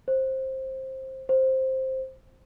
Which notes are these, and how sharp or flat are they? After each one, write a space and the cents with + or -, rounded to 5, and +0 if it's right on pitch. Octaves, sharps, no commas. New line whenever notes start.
C5 +15
C5 +5